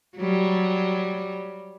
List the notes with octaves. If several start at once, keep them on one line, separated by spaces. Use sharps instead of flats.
F#3 G3